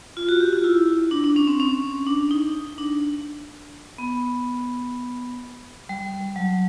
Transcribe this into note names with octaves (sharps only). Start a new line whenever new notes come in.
F4
F#4
G4
F4
E4
D4
D4
C#4
C4
C#4
D4
D#4
D4
B3
G3
F#3